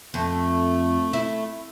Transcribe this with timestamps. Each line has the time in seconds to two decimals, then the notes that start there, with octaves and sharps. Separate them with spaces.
0.14 F2 A3
1.13 E4